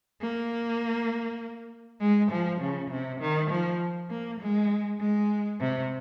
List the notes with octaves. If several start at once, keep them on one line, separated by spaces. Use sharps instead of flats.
A#3
G#3
F3
C#3
C3
D#3
F3
A#3
G#3
G#3
C3